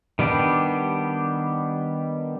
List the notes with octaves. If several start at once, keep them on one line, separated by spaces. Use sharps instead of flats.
D#3 G3 B3 D4 G4